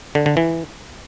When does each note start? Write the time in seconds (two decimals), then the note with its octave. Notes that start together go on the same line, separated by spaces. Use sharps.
0.15 D3
0.26 D3
0.37 E3